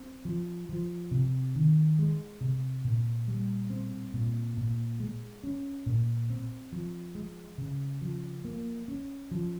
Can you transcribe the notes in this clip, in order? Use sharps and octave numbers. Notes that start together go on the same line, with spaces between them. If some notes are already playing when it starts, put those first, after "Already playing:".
Already playing: C4
F3
F3
C3
D#3
G#3
C3
A#2
G3
C4
A#2
A#2
G#3
C#4
A#2
C4
F3
G#3
C#3
F3
A#3
C#4
F3